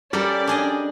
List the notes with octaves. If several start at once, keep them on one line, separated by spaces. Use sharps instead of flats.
G3 C#4 G4 A4 A#4 D5
D4 G#4 D#5